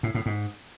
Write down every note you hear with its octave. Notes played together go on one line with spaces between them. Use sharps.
A2
A2
G#2